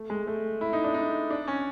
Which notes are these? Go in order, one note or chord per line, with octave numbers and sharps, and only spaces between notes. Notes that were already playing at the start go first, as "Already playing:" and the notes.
Already playing: A3
G#3
A3
E4
D#4
D4
D#4
D4
C#4